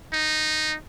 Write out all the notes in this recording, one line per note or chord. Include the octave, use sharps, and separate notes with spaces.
D#4